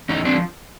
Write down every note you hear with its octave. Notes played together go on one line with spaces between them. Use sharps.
E2 C#4 D#4
F3 C4 D4